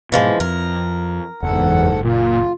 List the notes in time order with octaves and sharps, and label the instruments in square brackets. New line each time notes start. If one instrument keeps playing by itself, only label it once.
[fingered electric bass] G#2 B2 [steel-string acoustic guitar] E3 F3 G#3
[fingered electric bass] F2 [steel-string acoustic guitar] A#4
[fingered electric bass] F#1 [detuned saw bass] E2 [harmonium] G#2 A4 F#5
[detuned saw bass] A#2 [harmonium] F4